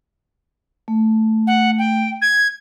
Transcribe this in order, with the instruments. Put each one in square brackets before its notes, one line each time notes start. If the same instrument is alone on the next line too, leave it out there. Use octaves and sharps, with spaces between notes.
[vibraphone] A3
[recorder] F#5
G5
G#6